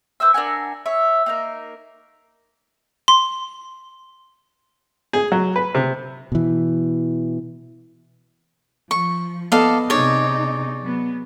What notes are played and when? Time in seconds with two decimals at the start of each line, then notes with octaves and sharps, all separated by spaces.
0.20 B4 C5 E5 E6
0.34 D4 A#4 F#5 G#5
0.86 C#5 E5
1.26 A#3 D#4 A#4
3.08 C6
5.13 G#4
5.32 F#3
5.56 B4
5.75 C3
6.32 B2 E3
8.91 F3 C#6
9.52 B3 A4 D5 D#5 F5 A5
9.90 C3 D#4 G#4 C#5 D5
10.84 F#3 B3